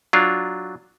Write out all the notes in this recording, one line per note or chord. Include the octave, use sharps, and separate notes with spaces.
F#3 D4 F4